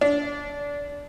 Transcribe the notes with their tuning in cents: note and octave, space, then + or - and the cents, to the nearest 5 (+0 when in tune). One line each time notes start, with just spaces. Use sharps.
D4 -25